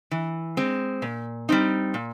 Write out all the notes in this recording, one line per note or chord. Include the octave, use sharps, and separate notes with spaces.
E3
G#3 C4
A#2
G3 C4 D#4
A#2